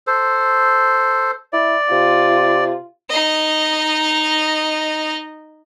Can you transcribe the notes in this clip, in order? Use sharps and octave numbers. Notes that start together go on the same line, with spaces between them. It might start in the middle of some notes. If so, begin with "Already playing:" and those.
A4 C5
E4 D5
C3 F4
D#4 D#5